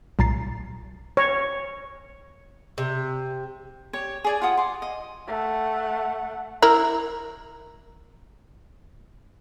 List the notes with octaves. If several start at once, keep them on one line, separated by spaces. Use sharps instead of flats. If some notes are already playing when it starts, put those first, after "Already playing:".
B1 A#2 A#5 A6 C7
C#5
C3
G4 C#5
G#4 D5 G#5
F4 G4 F#5 D#6
C6 D6
D#5
A3 F#5
E4 A#4